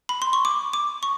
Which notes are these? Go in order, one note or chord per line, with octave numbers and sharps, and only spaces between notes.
B5
C6
C#6
D6
D6
C#6